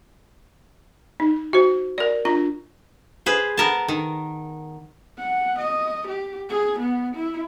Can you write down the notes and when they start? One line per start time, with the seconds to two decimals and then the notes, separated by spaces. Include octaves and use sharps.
1.20 D#4
1.53 F#4 C5
1.98 A#4 D5
2.25 D4 F4 A#5
3.26 G#4 B4 C5
3.57 B3 A#4 A5
3.88 D#3
5.18 F#5
5.59 D#5
6.08 G4
6.49 G#4
6.80 B3
7.15 E4